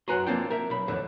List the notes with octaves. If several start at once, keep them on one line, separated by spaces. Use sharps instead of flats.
F#2 F#4 B4 G#5 A#5 C6
F3 A#3 C4 D4 F4 G5
A#4 E5
B1 B5
F2 A2 D3 E3